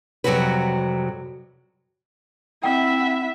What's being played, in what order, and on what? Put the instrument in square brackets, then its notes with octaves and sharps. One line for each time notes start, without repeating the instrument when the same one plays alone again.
[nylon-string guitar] F2 C3 F#3 G3 F#4 B4
[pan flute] C4 [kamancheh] E4 F#5 [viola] E5 [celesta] G5